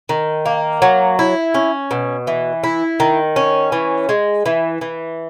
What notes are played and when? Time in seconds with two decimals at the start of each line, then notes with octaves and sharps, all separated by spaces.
0.09 D#3
0.45 A#3
0.82 F#3
1.19 E4
1.54 C#4
1.91 B2
2.27 E3
2.64 E4
3.00 D#3
3.36 C#4
3.72 E3
4.09 G#3
4.46 E3
4.81 E3